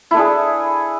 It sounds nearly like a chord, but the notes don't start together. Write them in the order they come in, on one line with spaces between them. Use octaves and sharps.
E4 A3 D4 G#4